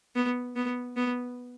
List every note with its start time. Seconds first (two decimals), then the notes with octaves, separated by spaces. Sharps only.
0.15 B3
0.56 B3
0.97 B3